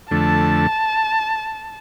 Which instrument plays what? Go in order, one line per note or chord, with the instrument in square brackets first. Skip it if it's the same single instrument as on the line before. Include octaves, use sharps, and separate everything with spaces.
[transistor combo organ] F2 D3 A3 [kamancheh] A5